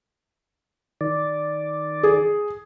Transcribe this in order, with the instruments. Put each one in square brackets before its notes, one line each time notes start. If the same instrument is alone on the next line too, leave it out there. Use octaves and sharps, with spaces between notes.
[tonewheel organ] D#3 D5
[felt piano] G#4